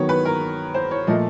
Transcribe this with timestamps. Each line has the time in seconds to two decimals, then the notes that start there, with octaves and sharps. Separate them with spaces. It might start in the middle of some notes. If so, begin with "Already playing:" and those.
Already playing: D#3 F#3 B3 C#5
0.09 B4
0.25 A#4
0.74 C5
0.91 C#5
1.07 A#2 F3 A3 D#5